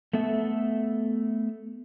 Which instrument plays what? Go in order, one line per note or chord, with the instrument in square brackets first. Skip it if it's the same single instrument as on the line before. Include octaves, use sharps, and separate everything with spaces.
[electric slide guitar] A3 B3 A4 E5